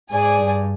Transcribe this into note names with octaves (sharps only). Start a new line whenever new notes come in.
G#2 G#4 D5 G#5
G2